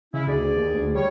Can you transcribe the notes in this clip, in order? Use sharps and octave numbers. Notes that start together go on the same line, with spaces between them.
C#3 G#3 C#4 E4
D2 G#4 D5
D#2
D2
G3 C#5